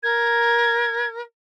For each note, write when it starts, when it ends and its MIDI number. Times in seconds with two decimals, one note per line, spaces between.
0.03 1.22 70
0.03 1.08 92